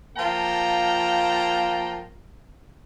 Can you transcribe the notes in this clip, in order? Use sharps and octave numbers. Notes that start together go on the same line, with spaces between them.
F3 A#3 F4 G5 A5 A#5